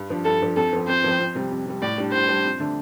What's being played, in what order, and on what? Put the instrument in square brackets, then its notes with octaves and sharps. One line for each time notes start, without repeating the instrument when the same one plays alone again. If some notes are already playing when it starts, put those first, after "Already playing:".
Already playing: [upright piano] G2
F3 D4
[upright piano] G2 [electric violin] A4
[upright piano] F3 D4
[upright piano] F2 [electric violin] A4
[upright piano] F3 C4
[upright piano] F2 [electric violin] C5
[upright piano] F3 C4
F2
C3 G3
F2
C3 G3
[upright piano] A2 [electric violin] D5
[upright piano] G3 D4
[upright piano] A2 [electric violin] C5
[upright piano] G3 D4
F2
D3 A3 D4